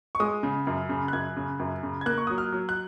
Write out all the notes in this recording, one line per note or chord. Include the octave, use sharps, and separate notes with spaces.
C#6
G#3 D#6
C#3
F#2
C#3
F#6
F#2 G#6
C#3
F#2
C#3
G#6
A#3 F#6
C#6
F#3 D#6
F6
F#3
F#6